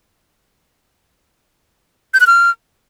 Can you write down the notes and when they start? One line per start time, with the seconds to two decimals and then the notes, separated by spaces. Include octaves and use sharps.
2.14 G6
2.20 F#6
2.27 F6